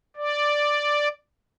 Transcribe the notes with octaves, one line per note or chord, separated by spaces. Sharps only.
D5